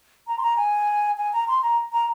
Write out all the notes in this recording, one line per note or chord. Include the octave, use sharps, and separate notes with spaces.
A#5
C6
A#5
G#5
G#5
A#5
C6
A#5
A#5